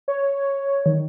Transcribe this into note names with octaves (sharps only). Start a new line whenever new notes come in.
C#5
D#3